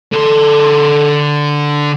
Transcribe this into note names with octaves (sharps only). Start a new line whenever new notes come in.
D3 A4 C6